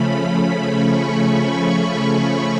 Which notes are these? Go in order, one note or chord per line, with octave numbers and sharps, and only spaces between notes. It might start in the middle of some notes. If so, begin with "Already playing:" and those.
Already playing: C#3 F3 A3 C#4 B5
B5
C#6
C#6
B5